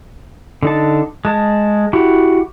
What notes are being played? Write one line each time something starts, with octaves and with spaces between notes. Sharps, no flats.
D3 D#4 A5
G#3 A5
E4 F#4 G4